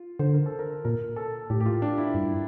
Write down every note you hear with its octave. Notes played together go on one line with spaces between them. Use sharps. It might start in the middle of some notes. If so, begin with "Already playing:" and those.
Already playing: F4
D3 C5
A#4
A4
A#4
A#2 A#4
A4
A2 G4
G4
F4
D4
E4
G2